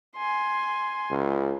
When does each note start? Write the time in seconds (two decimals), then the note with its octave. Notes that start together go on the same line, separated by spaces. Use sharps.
0.16 G#5 C6
1.10 C#2